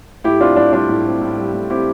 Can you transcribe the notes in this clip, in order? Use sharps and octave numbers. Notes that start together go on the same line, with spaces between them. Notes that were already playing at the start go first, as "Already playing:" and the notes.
A2 E4 G4
C4 D4 F4
A2 D4
G3 D4 F4
A2
C4
A2
G3
A2
C4 E4 G4